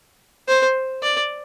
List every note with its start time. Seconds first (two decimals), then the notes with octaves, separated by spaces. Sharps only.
0.48 C5
1.03 D5